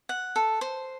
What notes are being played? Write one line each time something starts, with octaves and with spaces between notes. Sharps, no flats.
F#5
A4
C5